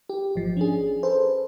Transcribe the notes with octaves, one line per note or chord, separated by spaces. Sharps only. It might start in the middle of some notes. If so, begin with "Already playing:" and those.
G4
G#1 F3
C#4 D4 G#4
A4 B4 C5